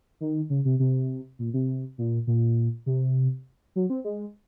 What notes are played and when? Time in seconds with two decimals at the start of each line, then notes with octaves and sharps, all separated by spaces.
0.21 D#3
0.50 C#3
0.65 C3
0.79 C3
1.39 A#2
1.54 C3
1.98 A#2
2.27 A#2
2.86 C3
3.76 F#3
3.90 C4
4.05 G#3